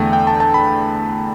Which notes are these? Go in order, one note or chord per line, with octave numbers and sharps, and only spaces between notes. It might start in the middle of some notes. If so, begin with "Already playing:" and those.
Already playing: E2 D3 A3 G5
G5
A5
A5
B5